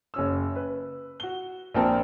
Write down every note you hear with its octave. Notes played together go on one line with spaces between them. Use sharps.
F#1 C#4 E6
B4
F#4 G7
A#1 C4 A#4 G5 A5